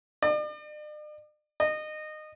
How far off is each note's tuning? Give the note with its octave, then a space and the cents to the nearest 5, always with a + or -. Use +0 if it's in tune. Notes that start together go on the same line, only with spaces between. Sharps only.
D5 +45
D#5 -20